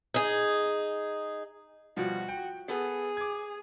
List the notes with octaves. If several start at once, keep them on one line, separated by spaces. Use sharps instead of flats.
D#4 G#4
B2 F3 G3 F#4
G5
B3 G#4 A4
D6 G#6